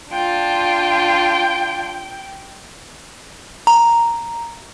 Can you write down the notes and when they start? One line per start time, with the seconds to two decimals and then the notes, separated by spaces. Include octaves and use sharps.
0.12 D4 F4 G5
3.67 A#5